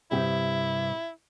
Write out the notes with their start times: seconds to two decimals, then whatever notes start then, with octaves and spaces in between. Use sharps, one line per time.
0.11 G2 C3 E4 G4